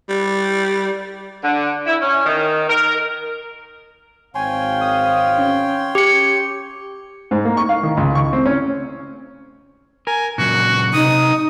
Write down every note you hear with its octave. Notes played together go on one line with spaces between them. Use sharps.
G3
D3
E4
C#4
D#3
A#4
G#1 C4 C#5 F5 G5 G#5 C6
D#6
C#4
G4 C#7
G#2
A#3
C#6
F5
D#3
C#2
C#6
C4
C#4
A#4 G#5
A#2 C#3 F#3 F#4
C3 D#4 D#6